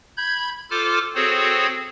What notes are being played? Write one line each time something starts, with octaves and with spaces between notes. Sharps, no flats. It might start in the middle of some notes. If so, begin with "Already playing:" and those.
B5 G6 G#6
F4 A4 C5 D6 F6
C4 F#4 G#4 A4 C5 C#5